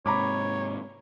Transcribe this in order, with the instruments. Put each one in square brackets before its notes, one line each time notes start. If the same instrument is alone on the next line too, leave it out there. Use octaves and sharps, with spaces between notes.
[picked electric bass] G#2 C3 [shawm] C#5 [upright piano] A#5 B5 D6